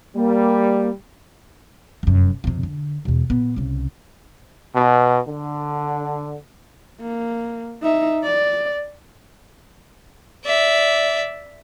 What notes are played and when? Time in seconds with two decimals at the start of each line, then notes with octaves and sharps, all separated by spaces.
0.15 G3 A#3
2.03 F1 F#2
2.44 F2 C3
2.63 D3
3.05 E2 B2
3.30 A#2 B3
3.56 C2 C#3
4.75 B2
5.27 D3
7.01 A#3
7.82 D#4 E5
8.24 D5
10.45 D5 E5